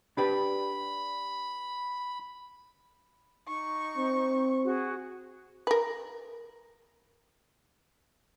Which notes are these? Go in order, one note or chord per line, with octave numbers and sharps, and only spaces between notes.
D4 G4 B4 B5
D#4 C#6
C4
F#4 G#4
A#4 B4